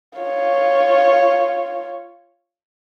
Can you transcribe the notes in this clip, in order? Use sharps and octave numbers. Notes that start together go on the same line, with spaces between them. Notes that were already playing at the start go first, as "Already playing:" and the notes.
F4 C#5